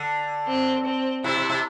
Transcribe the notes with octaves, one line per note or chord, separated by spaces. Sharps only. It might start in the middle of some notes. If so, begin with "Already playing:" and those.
Already playing: D3
C4
C4
C3 E4
C3
C3